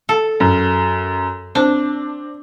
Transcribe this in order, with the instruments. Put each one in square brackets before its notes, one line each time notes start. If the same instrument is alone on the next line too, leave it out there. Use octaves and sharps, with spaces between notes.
[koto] A4
[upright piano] F#2
[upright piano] C4 [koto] D4